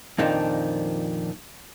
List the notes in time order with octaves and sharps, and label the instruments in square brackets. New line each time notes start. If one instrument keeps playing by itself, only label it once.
[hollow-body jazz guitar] F2 A#2 D#3 F3 D4